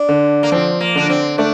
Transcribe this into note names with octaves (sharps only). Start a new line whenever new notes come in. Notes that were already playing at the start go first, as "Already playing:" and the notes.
Already playing: D4
D3
A#3
F3 C4
A#3
D3 D4
C4
A3 D4